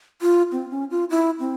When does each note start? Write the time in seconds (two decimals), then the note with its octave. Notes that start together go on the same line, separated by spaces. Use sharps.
0.22 F4
0.52 C4
0.71 C#4
0.91 F4
1.10 E4
1.40 C4